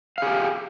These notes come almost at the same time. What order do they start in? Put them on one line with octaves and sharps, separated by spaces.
F5 G#4 G4